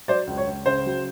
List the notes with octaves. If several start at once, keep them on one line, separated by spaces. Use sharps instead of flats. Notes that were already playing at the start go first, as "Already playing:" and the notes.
F#3 C5 D5
C#2
C#5
C#2
C#3 C5
F#3